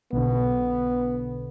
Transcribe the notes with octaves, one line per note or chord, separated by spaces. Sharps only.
B1 D3 B3